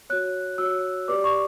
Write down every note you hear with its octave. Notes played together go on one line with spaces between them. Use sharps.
F#4 C#5 F#6
F#4 C#5 E6
G4 B4 D5 D6
C#6